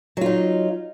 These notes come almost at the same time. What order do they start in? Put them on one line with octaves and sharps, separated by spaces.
F#3 F4 D#4